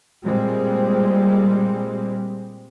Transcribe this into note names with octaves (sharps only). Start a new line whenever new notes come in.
A#2 G3 G#3 C4